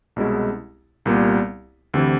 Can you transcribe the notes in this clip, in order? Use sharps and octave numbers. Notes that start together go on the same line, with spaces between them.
C2 B2 G#3 C#4 E4
C2 A#2 G3 B3
D2 C3 E3